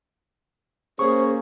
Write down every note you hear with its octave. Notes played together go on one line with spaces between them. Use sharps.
A#3 C#4 G#4 C5 C#6